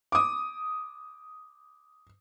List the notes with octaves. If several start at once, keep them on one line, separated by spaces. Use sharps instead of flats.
D6 D#6